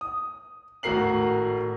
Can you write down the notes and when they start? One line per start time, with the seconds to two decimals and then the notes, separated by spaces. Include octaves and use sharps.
0.01 D#6
0.83 G#1 A2 F#4 A#4 C7 F#7